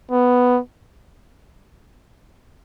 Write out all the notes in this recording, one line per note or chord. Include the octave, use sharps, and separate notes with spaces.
B3